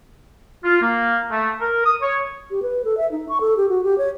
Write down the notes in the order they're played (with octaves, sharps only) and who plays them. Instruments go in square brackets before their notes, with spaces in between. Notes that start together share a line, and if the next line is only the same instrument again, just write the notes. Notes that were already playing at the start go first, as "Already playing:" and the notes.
[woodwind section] F4
A#3
A3
A#4
D#6
C#5
[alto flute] G4
B4
A4
E5
D#4
C#6
A4
G4
F#4
G4
C#5